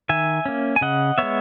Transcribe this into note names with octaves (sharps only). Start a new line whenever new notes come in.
D#3 E5 G#5
A#3 C#4
G#5
C#3 D#5 F#5
G#3 B3 C#5 E5